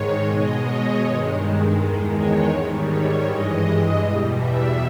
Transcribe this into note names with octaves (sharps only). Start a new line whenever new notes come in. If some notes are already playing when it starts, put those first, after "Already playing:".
Already playing: G#2 D#3 G#3 C#5
B2 G#3 D#5
C#5
G2 D#3 G#3
E2 D#3 G#3
C#5
G#2 D#3 G3
C#5
G2 E3 G#3 D#5
D#5
E2 B2 G3
E5